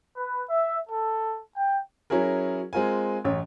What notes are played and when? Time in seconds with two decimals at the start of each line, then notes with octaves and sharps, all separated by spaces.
0.17 B4
0.50 E5
0.89 A4
1.56 G5
2.10 F#3 C#4 E4 G#4 A#4
2.73 G#3 C4 F4 A#4 G#5
3.24 A1 F#2 C#5